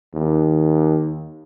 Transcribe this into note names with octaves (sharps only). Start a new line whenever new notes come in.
D#2